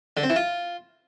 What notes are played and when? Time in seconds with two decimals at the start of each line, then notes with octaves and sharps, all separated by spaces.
0.17 D3
0.23 C4
0.30 E3
0.36 F4